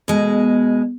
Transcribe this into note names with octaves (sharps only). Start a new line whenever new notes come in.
B2 G#3